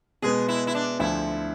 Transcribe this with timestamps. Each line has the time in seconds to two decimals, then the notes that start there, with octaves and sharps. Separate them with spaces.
0.22 B2 G#3 B3 G#4
0.48 E4
0.67 E4
0.75 D4
1.00 D2 D3 F3 E4